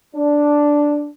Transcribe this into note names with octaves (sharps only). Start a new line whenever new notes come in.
D4